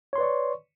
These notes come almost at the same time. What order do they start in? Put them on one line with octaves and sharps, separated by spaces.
C#5 C6 B4 D5 C#6